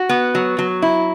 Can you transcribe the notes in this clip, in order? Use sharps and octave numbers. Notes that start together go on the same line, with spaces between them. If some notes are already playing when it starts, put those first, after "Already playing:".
Already playing: F#4
B3
F#3
F#3
E4